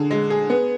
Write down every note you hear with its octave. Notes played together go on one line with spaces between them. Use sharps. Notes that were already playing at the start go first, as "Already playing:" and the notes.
Already playing: D3 G#4
G#3
G#4
B3